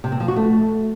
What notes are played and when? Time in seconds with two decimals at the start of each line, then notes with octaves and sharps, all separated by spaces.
0.04 C3
0.12 C4
0.20 F3
0.28 F#4
0.36 A3